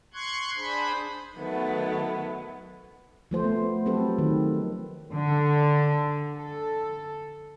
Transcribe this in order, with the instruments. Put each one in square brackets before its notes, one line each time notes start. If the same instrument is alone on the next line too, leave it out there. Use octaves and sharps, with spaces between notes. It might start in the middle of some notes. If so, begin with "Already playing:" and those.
[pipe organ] C6 C#6 F#6 G#6
D4 G#4 C5 B5
[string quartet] D#3 F#3 A3 B3
[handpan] F3 A3 C5
B3
F#3 C4 G4 A4 B4
D#3
[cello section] D3
A4